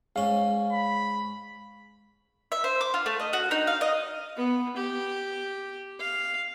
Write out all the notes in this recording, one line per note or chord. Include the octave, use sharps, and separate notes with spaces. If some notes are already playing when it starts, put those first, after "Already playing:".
G#2 C#4 F5
B5
E5
C5
D6
F4
A3
D#5
F#4
D#4
F5
D#5
B3
G4
F5